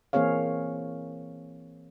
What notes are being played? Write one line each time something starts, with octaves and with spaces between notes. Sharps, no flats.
E3 A#3 C4 G#4 C#5 F5